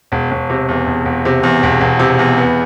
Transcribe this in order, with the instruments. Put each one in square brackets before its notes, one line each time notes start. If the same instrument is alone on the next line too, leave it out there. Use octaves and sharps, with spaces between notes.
[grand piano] E1
E1
C3
E2
E1
E1
C3
E2
E1
E1
C3
E2
B3